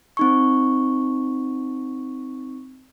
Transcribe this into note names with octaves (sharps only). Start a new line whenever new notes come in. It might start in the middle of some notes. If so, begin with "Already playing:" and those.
C4 D#4 C#6